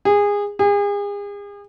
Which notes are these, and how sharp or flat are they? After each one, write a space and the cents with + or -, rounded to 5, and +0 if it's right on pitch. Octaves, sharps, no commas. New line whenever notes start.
G#4 -25
G#4 -40